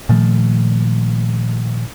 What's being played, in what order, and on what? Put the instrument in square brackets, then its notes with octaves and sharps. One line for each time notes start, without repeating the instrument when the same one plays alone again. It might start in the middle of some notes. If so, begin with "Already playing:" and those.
[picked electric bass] A#2 D#3 F3 A3